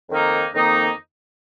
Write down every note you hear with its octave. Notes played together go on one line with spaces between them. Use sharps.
F2 D#3 A#3 D#4
F2 D#3 A#3 D#4